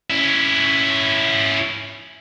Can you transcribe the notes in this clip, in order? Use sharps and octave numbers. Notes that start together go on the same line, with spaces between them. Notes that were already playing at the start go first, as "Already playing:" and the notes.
C#4 E4